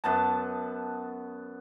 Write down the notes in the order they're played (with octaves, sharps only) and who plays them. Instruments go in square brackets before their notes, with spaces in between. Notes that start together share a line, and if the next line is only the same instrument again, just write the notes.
[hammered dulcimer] F#2 B3 A5